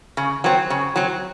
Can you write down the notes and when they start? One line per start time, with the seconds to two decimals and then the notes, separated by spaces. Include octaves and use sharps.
0.17 C#3
0.44 F#3 C4
0.70 C#3
0.96 F#3 C4